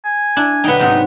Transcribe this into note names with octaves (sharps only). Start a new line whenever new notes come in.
G#5
D4 E4
D3 F#3 B3 D#4 G5
G#2 C3 F#3 D#4